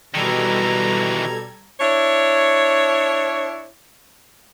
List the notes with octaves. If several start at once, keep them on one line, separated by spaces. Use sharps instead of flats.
B2 D#3 E3 G3 A4 A#5 G#6
D4 E4 C#5